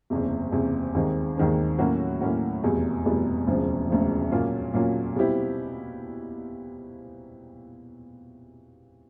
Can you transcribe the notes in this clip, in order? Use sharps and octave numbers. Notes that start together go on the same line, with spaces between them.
F#1 E2 C3
F#1 E2 C3
D#2 D#3 G#3 C4
D#2 D#3 G#3 C4
A2 F#3 A#3 C#4 F#4
A2 F#3 A#3 C#4 F#4
F1 E2 B2 G3
F1 E2 B2 G3
E1 D2 C#3 F3
E1 D2 C#3 F3
A#2 F#3 A#3 C#4 F4
A#2 F#3 A#3 C#4 F4
B2 G3 C4 E4 G4